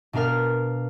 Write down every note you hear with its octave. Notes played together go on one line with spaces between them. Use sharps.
B2 D4 A#4 F5 F6